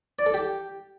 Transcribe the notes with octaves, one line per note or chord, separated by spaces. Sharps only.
D5
A4
G4